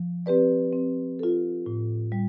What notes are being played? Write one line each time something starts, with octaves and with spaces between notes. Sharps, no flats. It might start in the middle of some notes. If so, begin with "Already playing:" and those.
Already playing: F3
C4 G4 B4 D5
C4
F4 A4
A2
G3